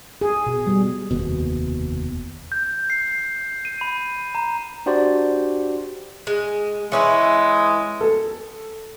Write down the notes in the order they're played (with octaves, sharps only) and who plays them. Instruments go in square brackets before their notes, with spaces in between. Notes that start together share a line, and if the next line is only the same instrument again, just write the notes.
[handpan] G#4
B2
G3
[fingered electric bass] F1 D#2 B2
[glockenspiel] G6
C7
D#7
B5
A#5
[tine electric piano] D4 F#4 G4 C5 D5
[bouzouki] G#3
[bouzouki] E3 C#4 E4 [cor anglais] G#3
[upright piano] A4